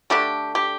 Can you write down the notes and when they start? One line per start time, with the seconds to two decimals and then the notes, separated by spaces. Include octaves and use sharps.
0.10 D3 A3 D4 G4
0.55 G4